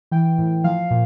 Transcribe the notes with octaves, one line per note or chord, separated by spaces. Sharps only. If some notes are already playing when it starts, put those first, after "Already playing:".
E3 G5
A2
F3 F5
A#2